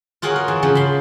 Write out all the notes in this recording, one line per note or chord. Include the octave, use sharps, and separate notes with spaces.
F4 F#4 G#4 A#4 C#5 F#5
A#4
E3
C#3 F3
B5 C6